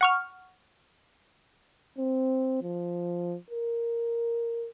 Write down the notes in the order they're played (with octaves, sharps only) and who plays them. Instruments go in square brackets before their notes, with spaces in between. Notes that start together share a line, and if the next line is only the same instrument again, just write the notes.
[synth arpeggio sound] F#5 C#6 F6
[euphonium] C4
F3
A#4